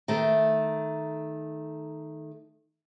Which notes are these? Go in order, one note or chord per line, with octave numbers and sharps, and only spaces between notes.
D#3 A3